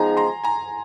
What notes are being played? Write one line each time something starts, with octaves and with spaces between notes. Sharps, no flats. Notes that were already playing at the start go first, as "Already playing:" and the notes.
Already playing: F3 G#3 B3 D#4 G#4 G#5 A#5
A#5 C6
G#5 A#5